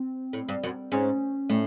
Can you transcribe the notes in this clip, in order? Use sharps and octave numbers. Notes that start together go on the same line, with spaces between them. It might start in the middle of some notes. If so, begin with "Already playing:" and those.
Already playing: C4
A2
G2
F#2
G#2 C#4
A2 A3